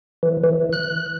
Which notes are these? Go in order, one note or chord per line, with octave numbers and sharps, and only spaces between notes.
E3
E3
F#6